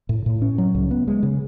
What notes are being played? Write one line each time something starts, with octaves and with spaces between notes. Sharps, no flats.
A2
A2
C#4
F#3
C#2
B3
G#3
C#3